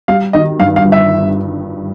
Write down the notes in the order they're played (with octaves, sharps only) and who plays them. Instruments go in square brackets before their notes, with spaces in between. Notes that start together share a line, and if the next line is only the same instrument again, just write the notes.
[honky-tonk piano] G3 [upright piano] F5
[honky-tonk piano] D#3 [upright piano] D#5
[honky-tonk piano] G2 [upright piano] F5
[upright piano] F5
[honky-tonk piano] G1
[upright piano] E5